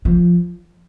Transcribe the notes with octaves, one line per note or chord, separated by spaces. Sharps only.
F3